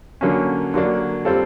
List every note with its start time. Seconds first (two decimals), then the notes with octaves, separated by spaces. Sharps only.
0.21 D3 F#3 A#3 C#4
0.74 D3 F#3 A#3 D4
1.25 G3 C4 F4 A4